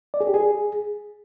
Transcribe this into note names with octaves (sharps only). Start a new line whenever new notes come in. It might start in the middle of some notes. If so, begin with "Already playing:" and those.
D5
G#4
G4
G#4